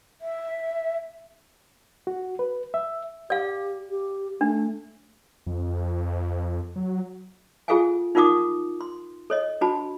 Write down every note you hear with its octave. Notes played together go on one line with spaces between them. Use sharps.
E5
F#4
B4
E5
G4 D5 F5
G4
A3 D4
F2
F#3
F4 G#4 A4 F5 F#5 G#5
D#4 F4 A#4 F#5 D6 D#6
C6
A4 C#5 D#5
D4 F#4 A5 B5